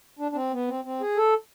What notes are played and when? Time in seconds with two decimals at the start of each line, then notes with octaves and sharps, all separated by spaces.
0.19 D4
0.32 D4
0.35 C4
0.52 B3
0.68 C4
0.85 C4
1.01 G#4
1.17 A4